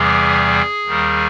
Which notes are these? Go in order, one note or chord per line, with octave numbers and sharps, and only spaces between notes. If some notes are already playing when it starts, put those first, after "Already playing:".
Already playing: E2 C3 E3 G3 G#4
D#2 D#3 G3